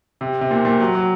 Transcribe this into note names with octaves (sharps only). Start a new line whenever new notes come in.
C3
C3
A#2
A#2
F#3
F#3